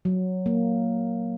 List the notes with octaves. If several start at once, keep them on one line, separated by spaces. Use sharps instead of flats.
F#3
A#3